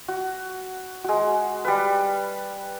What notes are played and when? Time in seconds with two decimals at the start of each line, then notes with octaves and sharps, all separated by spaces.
0.08 F#4
1.04 G#3 F#4
1.65 G3 B4